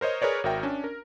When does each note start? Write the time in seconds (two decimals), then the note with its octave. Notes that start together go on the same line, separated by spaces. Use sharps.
0.01 A#4 C5 C#5 D#5
0.22 G#4 A#4 B4 C#5 D5
0.44 G#1 F#4 A#4 E5 G5
0.63 C#4 D4
0.84 A#4